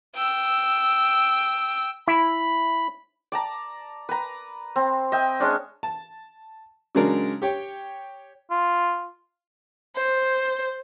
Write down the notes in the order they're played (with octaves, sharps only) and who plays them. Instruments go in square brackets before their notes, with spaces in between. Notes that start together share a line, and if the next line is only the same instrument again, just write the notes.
[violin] G5 E6
[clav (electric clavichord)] E4 [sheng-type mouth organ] B5
[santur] D5 A5 A#5
B4 A#5
C4
D#5 E5 G5
G#3 C#4 D4
[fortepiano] A5
C#3 F#3 G#3 D4 A#4
G4 C#5 G5
[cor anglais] F4
[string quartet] C5